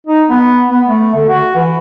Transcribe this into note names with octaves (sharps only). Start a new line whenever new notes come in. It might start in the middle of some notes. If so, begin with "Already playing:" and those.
D#4
B3
B3
A3
D3
F#4
E3